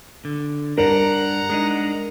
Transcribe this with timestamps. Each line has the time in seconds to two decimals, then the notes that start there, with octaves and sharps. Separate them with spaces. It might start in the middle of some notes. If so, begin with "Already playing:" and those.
0.25 D3
0.78 G2 G3 D4 A#4 F#5 A#5
1.50 G#3 D4 D#4